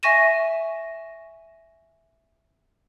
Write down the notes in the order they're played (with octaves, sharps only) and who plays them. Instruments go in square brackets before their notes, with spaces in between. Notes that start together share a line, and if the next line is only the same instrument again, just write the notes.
[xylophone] E5 G#5 C#6 A#6 D#7 E7